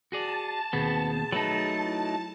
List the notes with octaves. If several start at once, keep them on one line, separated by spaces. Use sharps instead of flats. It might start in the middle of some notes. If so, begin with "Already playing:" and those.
F#4 G#4 D5 A5
D#2 B2 B3 C4 G#4
F#3 A3 D#4 B4
E4